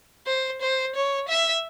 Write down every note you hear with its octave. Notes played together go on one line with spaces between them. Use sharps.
C5
C5
C#5
E5